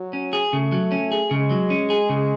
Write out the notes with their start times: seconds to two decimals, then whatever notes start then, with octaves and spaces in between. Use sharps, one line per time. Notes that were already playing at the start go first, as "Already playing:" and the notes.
Already playing: F#3
0.13 C#4
0.33 G#4
0.52 C#3 A3
0.72 F#3
0.92 C#4
1.12 G#4
1.31 C#3 G#3
1.51 F#3
1.70 C#4
1.90 G#4
2.09 C#3